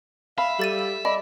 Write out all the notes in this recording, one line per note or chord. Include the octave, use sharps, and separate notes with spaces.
E5 F5 B5
G3 A4 A6 D#7
E6
D5 D#5 B5